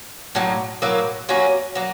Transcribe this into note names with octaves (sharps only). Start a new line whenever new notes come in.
A2 F#3 A#3
A2 F#3 A#3
F#3 A#3 C#4 F#4
F#3 A#3